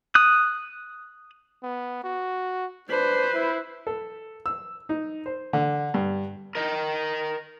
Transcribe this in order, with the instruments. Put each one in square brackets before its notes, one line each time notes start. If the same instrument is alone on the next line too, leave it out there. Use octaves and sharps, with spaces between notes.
[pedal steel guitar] D#6 F#6
[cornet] B3
F#4
[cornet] D4 [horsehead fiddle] B4 C5
[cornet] E4
[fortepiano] A4
E6
D#4
C5
D3
G2
[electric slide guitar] A#4 D#5